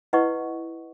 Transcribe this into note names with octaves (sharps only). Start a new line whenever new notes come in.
E4 B4 D#5 F#5 C#6